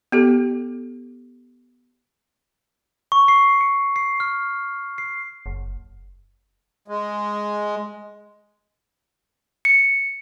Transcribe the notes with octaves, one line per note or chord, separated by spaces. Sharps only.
B3 G4 A4
C#6
C7
C#7
C7
F6
C7
F#1
G#3
C#7